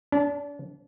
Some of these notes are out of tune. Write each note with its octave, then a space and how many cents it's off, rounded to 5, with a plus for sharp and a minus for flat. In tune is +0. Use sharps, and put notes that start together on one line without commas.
D4 -35 A5 +10